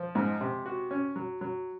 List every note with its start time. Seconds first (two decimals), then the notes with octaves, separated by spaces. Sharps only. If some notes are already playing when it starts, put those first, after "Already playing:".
Already playing: F3
0.15 G#2 G#3
0.41 C3
0.66 F#4
0.91 C#4
1.16 F#3
1.41 F#3